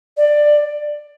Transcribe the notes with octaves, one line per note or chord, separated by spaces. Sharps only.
D5